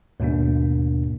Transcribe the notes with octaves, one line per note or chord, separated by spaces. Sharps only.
D#2 G#2 B2 A#3 D4